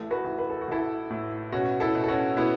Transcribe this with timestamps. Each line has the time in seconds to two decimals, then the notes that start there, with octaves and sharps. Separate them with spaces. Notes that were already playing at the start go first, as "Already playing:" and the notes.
Already playing: A1 A3
0.11 F#4 B4
0.25 A1
0.39 B4
0.50 A4
0.61 F#4
0.68 A1 E4 A4
1.10 A2
1.52 B2 C#4 F#4
1.80 E4 A4
1.95 B2
2.04 A4
2.08 C#4 F#4
2.37 B2 B3 E4